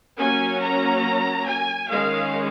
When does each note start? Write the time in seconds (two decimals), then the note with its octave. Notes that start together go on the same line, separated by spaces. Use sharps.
0.18 F#3 A#3 C#4 G#5
0.61 A#5
1.45 G#5
1.89 D#3 G#3 C#4 F5